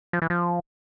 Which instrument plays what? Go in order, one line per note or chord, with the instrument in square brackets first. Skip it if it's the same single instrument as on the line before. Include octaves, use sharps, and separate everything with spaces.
[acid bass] F3
E3
F3